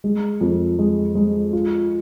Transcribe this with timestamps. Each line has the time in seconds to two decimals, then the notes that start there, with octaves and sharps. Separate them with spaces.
0.04 G#3
0.41 F2
0.79 G#3
1.15 G#3
1.53 F4